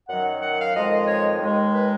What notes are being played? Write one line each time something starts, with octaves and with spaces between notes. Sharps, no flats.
F#2 D#3 F#3 F#5
F#5
F5
F2 D#3 G#3 D#5
C#5
D#2 D#3 G#3
B4